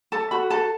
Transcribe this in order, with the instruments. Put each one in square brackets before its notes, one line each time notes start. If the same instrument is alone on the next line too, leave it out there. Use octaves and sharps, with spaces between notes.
[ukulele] A4 A5
F#4 B5
A4 A5